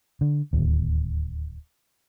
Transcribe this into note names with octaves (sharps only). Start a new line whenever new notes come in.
D3
D1 D#2